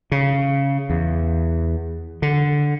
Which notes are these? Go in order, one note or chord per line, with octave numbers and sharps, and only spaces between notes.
C#3
E2
D3